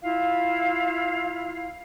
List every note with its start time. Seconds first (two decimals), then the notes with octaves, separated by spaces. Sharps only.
0.03 E4 F4 F5